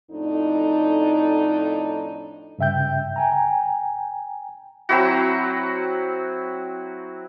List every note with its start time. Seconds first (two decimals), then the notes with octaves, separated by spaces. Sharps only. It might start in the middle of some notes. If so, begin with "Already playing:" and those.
0.11 F2 A2 D4 D#4
2.58 G2 C#3 E5 G5 G6
3.16 G5 G#5 A#5
4.89 F#3 C4 E4 F#4